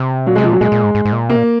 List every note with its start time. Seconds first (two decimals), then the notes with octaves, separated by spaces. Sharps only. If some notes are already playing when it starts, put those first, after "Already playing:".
Already playing: C3
0.26 A#2 F#3
0.35 G#3
0.38 C3
0.44 F3
0.49 A#2
0.53 F#3
0.61 A#2 G#3
0.72 A#2
0.84 G#2
0.95 G#2
1.05 G#2
1.12 A#2
1.29 C3 A#3
1.36 A#2